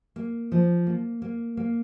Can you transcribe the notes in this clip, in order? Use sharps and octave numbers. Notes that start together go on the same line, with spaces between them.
A#3
F3
A#3
A#3
A#3